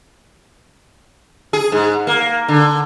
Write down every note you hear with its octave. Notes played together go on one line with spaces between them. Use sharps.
G#4
G#2
A#3
D3